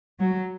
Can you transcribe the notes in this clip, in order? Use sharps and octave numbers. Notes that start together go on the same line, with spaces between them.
F#3